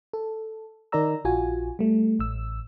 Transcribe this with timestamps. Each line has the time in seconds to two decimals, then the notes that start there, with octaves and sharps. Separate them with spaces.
0.13 A4
0.92 D#3 D#4 A#4 D5 A#5 E6
1.25 A#1 F4 F#4 G#5
1.79 G3 A3
2.19 A1 E6